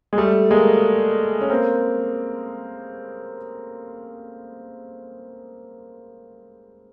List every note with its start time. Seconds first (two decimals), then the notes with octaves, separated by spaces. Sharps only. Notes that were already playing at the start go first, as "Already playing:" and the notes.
0.13 G#3
0.18 G3 A3
0.51 G#3 A#3
1.41 C#4
1.49 A#3 C4